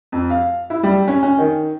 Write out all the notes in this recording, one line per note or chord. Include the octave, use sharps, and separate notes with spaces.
F2
F5
E4
G3
C#4
C#4
D#3